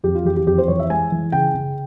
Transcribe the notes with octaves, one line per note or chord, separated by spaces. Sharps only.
F2 G4
F4
E3 G4
G4
F2 G4
C5
E3 C#5
E5
G#3 G#5
E3
C#3 G5
C#3